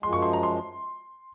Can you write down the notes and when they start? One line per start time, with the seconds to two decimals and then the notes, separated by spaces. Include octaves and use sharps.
0.03 F#2 F3 G#3 C6
0.13 C#6
0.22 C6
0.33 A#5
0.43 C6